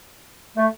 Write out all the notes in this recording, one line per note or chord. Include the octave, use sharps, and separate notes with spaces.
A3